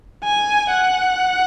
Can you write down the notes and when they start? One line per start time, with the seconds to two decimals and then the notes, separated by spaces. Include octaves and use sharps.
0.24 G#5
0.70 F#5